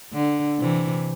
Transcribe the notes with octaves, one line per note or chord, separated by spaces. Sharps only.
D3
C3 E3